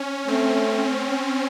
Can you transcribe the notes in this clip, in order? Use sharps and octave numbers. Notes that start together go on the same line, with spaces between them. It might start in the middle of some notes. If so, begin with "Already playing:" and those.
Already playing: C#4
A3 C4